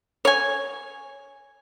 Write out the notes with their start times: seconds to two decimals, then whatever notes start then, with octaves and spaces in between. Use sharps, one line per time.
0.25 C#5 G#5